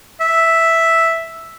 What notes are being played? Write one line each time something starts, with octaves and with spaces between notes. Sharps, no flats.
E5